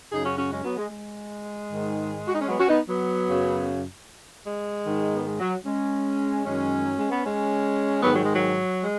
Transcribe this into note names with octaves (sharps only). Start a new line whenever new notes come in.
F#2 C#3 D#4 G#4
C#4 F#4
C#4 F#4
G#3 C#4
F#3 B3
G#3
G#3
G#2 D#3
F#4
D#4
C#4
F#3 B3
C#4 F#4
B3 D#4
F#3 B3
F#2 C#3
G#3
G#2 D#3
B3
G#3
F#3
G#3 C#4
F#2 D#3 G#3 C#4
F#3
G#3
B3
G#3 C#4
G#2 D#3 F#3 B3
F#3
G#3
F#3
G#3